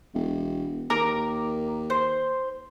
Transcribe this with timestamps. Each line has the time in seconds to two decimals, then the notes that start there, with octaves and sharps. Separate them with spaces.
0.14 E1
0.90 D#2 A#4 A#5 D6
1.90 C5